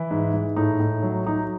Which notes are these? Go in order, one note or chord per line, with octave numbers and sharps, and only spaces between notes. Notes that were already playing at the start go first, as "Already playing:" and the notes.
Already playing: E3 E4
G#2
G#2
A2 D#4
A2
F#3
F#3 D#4